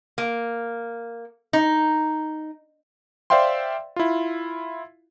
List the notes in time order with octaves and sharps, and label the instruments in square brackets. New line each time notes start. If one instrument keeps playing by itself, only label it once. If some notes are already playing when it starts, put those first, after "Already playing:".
[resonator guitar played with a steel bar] A#3
D#4
[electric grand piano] C5 D5 E5 F5 G5 C6
E4 F4